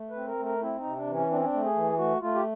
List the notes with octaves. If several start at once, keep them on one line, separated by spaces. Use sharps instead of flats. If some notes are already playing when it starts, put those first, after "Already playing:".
Already playing: A3
B4
C4
A#4
A3
A#4
C4 E4
D#4
C3
D4
E3
C#4
C4 D4
C#4
D4
A3
G#4
E3
A3 F#4
A3 F4
G4